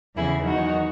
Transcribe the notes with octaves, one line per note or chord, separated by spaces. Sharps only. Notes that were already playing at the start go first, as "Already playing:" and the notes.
E2 C#3 E3 E4 G#4
E2 D#3 F#3 D#4 F#4